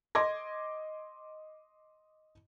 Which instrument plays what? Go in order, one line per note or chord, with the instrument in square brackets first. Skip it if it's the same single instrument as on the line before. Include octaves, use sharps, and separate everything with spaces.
[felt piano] D#5 C6 D6 G#6 A#6